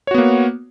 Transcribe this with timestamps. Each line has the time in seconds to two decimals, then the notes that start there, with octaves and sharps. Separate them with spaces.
0.07 C#5
0.11 F#4
0.14 B3
0.18 A#3